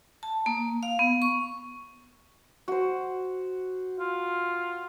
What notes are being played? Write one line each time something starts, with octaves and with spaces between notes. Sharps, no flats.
A5
A#3
F5
B3
C#6
F#4 C5
F4